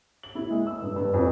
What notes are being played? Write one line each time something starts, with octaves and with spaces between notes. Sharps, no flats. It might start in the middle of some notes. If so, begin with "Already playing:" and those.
F#7
E4
G#3
E6
G2
G2
F2